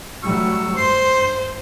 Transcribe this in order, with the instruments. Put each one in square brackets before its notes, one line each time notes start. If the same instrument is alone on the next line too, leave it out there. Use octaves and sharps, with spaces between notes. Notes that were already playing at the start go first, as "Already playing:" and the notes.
[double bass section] F#3 G3 A3 [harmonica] C#6 E6
[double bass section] G2 [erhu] C5 [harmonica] C6